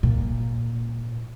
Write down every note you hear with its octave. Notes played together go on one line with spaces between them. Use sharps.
A#2